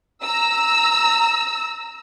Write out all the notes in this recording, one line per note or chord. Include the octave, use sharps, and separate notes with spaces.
A#5 E6